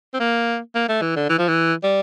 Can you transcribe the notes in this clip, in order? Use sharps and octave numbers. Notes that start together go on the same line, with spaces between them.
C4
A#3
A#3
A3
E3
D3
E3
F3
E3
G3